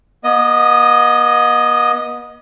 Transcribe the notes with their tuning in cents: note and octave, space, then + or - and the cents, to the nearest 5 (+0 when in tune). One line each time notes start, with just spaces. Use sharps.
B3 -40 D#5 +0